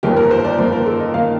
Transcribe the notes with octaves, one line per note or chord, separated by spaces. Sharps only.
G1 F2 D#3 A#3 G4
A#4
C5
D5
G1 F2 D#3 A#3 C5
A#4
A4
D#5
D#3 A#3 F5